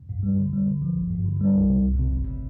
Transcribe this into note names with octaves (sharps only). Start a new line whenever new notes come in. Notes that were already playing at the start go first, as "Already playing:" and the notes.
G2
G3
D3
G3
D3
F3
G1
G2
D3
G3
C2
C3
C2
C3
G1